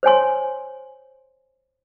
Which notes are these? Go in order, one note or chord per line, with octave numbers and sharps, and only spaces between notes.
C5 C#5 G#5 C6